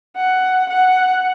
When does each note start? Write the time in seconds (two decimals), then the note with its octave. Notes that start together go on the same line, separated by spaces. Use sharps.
0.17 F#5
0.70 F#5